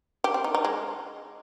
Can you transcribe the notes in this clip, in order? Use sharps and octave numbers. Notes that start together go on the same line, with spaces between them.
G4
C4
D#4
D#4
G#3